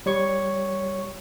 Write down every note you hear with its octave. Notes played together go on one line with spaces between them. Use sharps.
G3 C#5 C#6